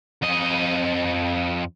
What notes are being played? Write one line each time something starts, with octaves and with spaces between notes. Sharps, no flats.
F2 D#5